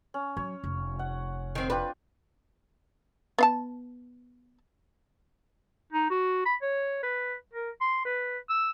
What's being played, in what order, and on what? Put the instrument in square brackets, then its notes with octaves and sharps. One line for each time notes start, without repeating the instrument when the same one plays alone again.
[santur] C#4
[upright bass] F#3 [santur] C#5
[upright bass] F1
[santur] F#5
[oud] D#3 C4
[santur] D4 F4 G5 [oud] B4
[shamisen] B3 F5 A5
[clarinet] D#4
F#4
B5
C#5
B4
A#4
C6
B4
E6